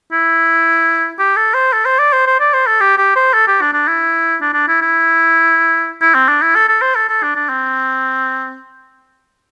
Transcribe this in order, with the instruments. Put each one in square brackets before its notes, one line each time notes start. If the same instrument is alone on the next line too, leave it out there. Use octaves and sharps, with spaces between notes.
[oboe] E4
G4
A4
C5
A4
C5
D5
C5
C5
D5
C5
A4
G4
G4
C5
A4
G4
D4
D4
E4
D4
D4
E4
E4
E4
C4
D4
E4
A4
A4
C5
A4
A4
D4
D4
C4